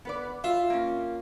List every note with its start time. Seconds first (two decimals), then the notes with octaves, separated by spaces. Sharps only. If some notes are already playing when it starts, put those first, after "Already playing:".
0.05 B3 B4 D5
0.44 F4 E5
0.70 A#3 C#4